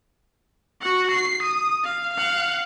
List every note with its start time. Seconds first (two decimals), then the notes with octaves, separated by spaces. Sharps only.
0.81 F#4 F#5
1.11 C7
1.43 D#6
1.84 F5
2.13 F5 F#5